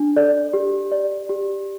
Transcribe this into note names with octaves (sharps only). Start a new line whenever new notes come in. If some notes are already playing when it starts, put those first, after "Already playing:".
Already playing: D4
A4 D5
G4
D5
G4